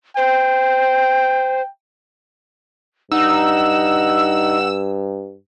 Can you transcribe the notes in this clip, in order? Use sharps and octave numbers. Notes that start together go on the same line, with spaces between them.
C5 G5
G2 D#4 F#5 E6